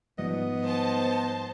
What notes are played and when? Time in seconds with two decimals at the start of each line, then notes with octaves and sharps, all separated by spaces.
0.18 G#2 F3 G3 B3 D#5
0.64 C5 A5